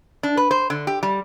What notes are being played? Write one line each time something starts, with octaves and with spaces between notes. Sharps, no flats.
D4
B4
C5
D3
G4
G3